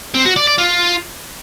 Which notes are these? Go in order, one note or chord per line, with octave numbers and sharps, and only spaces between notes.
C4
F#4
D5
D5
F4